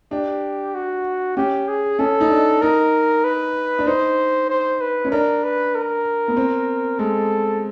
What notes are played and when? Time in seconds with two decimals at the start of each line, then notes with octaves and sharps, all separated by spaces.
0.11 D4 G4
0.74 F#4
1.37 C#4 G4
1.68 G#4
1.99 C#4 A4
2.21 D#4
2.30 D4
2.62 D#4 A#4
3.24 B4
3.79 D4
3.87 D#4 C5
4.50 C5
4.81 B4
5.05 C#4
5.12 D4 A#4
5.44 B4
5.75 A#4
6.28 B3
6.37 C4
6.99 G#3 A4